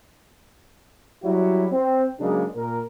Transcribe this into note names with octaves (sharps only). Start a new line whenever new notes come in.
F#3 G3 E4 F#4
C4
C#3 F#3 G#3 A#3 D4
A#2 A#4